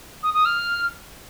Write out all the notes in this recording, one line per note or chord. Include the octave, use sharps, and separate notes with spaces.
D#6
D#6
F6